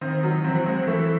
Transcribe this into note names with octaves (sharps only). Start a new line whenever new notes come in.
D#3 C4
F#3
E3 C4
F#3
G#3 C4
F#3
E3 A3